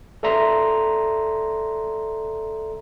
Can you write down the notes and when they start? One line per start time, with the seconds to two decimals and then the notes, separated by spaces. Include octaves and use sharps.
0.23 A4 D5 E5 A#5 C6